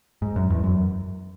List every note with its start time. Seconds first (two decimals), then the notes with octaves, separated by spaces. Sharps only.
0.22 G#2
0.36 F#2
0.50 E2
0.64 F#2